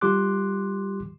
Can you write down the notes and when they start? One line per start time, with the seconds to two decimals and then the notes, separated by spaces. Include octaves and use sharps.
0.01 G3 F4 G4 C6 D6 F#6